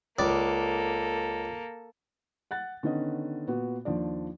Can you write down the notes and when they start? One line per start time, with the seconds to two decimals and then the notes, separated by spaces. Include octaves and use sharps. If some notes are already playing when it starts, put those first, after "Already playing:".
0.19 C#2 A#3 A4 D5
2.51 F#5 F#6 A6
2.83 D3 D#3 B3 C#4 D#5
3.47 A#2 B3 F#4
3.85 D#2 F3 D4 D5